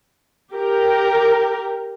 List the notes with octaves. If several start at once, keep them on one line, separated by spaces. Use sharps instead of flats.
G4 A#4